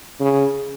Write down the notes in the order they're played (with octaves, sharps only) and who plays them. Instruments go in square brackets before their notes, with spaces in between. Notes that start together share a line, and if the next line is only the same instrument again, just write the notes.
[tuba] C#3